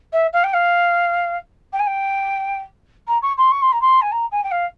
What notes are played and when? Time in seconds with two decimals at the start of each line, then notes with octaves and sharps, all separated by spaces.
0.12 E5
0.33 F5
0.43 G5
0.53 F5
1.72 G5
1.79 G#5
1.86 G5
3.07 A#5
3.22 C#6
3.37 C6
3.51 C#6
3.62 C6
3.72 A#5
3.81 C6
4.01 G#5
4.11 A#5
4.31 G#5
4.43 G5
4.51 F5